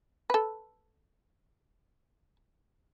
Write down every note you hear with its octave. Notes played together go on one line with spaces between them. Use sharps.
A4 B4